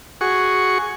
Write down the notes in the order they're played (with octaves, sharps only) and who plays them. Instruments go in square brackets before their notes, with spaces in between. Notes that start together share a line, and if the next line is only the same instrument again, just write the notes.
[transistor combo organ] F#4 G#4 C#6